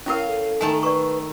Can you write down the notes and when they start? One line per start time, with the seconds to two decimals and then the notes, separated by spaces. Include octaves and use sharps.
0.06 C#4 E4 A#4 C#5 D#5 F5
0.28 A4
0.61 D#3 A3 G#5 A5 C6
0.83 B4 D5 C#6